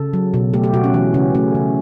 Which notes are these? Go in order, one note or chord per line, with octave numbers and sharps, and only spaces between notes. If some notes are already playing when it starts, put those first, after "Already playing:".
Already playing: C#3 A4
F#3
B2
A3 G4
G4
B2 F#4
C#4
E3 C#4
C#3 C#4
A3 C#4
C#3